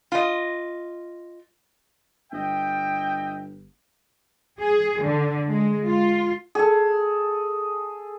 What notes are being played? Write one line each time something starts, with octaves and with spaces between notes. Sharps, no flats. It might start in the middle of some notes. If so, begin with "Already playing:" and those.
F4 D#5
G1 D#5 E5 G5
G#4
D3
G#3
F4
G#4 A4